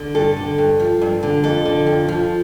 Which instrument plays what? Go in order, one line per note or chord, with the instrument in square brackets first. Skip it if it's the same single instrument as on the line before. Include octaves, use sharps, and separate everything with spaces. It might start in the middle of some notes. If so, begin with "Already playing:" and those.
Already playing: [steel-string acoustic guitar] D3
G2 A4
D3
G2
F3
G2
D3
F2 A4
D3
F2
F3